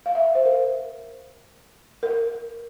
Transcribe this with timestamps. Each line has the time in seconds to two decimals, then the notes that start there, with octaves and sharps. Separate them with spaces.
0.06 F5
0.15 E5
0.35 C5
0.45 A#4
2.03 A#4